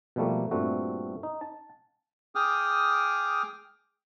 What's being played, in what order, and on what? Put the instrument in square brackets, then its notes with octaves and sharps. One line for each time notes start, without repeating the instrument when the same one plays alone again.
[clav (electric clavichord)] B2 F3 G3 A3 A#3
G2 A#2 G3 A3 C4 F#4
D#4
A5
[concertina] G#4 G5 D6 D#6 F6